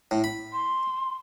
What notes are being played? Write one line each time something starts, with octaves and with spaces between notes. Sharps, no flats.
A2
B5
C6